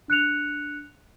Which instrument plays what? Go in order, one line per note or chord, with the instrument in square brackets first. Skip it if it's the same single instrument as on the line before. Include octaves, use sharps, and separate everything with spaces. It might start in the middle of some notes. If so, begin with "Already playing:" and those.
[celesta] D4 F#6 C#7 F7